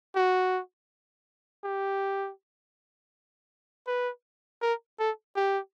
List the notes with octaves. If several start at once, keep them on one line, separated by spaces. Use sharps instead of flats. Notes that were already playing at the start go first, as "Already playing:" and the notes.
F#4
G4
B4
A#4
A4
G4